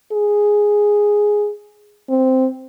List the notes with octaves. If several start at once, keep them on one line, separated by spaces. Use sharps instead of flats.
G#4
C4